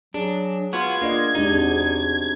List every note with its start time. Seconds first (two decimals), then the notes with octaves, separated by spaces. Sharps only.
0.14 F#3 D4 G#4
0.73 B3 F4 F#4 G#6
1.02 A#3 D4 D5 D#5
1.35 E2 G#3 D4 D#4 G4
1.53 B3 C4 F#4